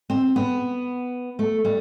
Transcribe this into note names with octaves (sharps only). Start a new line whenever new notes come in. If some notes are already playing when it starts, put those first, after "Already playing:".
C4
B3
A3
G3